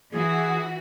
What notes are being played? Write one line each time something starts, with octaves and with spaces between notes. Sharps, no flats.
E3 F#4 G#4